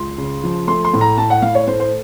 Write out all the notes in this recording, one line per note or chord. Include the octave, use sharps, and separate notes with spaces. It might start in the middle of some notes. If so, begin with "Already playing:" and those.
Already playing: C#2 C6
C#3
F3
A3 C6
C6
A2
A#5
A3 A5
F#5
A2 F5
C#5
A3 C5
C5